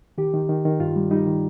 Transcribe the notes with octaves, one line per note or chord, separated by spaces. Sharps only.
D#3 G4
D#3
D#3
D#3
G2 F4
G3
G3 D#4
D#3